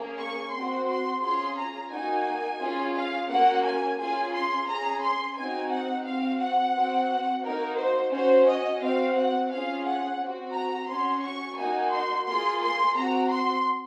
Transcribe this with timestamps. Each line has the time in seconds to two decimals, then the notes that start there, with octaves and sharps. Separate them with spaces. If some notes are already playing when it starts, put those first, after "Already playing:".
Already playing: A#3 C#4 G#4
0.18 C#6
0.52 C4 F#4 C6
0.88 C6
1.22 C#4 F4 G#4 C6
1.56 A#5
1.90 A#3 D#4 F#4 G#5
2.60 C#4 F4 G#4
2.95 F5
3.29 A#3 C#4 F#4 F#5
3.64 G#5
3.98 C#4 F4 G#4 G#5
4.32 C6
4.67 C#4 G#4 A#5
5.01 C6
5.36 C4 D#4 F#4 G#5
5.71 F#5
6.05 C4 F#4 F5
6.40 F#5
6.74 C4 F#4
7.43 A#3 D#4 F#4 A#4
7.77 C5
8.12 C#4 F#4 C5
8.47 D#5
8.81 C4 F#4 F5
9.16 F#5
9.50 C#4 F4 G#4 F5
9.85 F#5
10.19 C4
10.24 F#4
10.54 A#5
10.88 C#4 F#4 C6
11.23 C#6
11.57 A#3 D#4 F#4 G#5
11.92 C6
12.27 A#3 F4 G#4 C6
12.62 C6
12.95 C4 F#4 A#5
13.30 C6